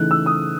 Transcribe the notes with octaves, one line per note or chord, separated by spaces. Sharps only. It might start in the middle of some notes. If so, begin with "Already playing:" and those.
Already playing: C#3 E3 A3 D#4 F#6
E6
D#6